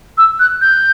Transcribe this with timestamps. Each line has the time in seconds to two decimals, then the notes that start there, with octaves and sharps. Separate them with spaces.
0.18 E6
0.40 F#6
0.61 G6